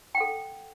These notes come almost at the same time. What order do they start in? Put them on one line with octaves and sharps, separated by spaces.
G5 F#5 A4